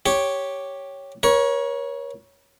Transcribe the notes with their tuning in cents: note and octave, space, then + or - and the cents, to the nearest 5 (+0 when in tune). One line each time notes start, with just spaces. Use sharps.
G4 +0 C#5 +0
A#4 +40 C#5 +0